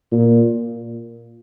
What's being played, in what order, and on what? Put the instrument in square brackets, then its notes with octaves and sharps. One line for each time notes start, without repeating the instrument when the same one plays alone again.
[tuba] A#2